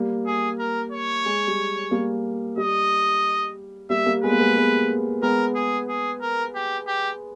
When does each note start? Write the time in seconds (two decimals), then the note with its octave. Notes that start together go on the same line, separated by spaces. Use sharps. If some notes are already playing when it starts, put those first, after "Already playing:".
Already playing: G3 A#3
0.26 G#4
0.59 A#4
0.92 C#5
1.26 G#3
1.47 G3
1.91 G3 A#3
2.57 G3 D#5
3.90 G3 A#3 E5
4.06 G3 A#3
4.23 G#3 B3 B4
4.31 A#3
4.39 G#3 B3
4.56 G#3 B3
5.22 G#3 B3 A#4
5.55 G#4
5.88 G#4
6.21 A#4
6.55 G4
6.87 G4